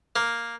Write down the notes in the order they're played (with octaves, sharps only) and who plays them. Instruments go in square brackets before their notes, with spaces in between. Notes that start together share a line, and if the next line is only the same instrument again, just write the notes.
[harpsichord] A#3